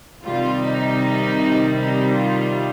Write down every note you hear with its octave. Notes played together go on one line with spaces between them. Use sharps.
C3 D#3 G3 F4
D#4
D#4
F4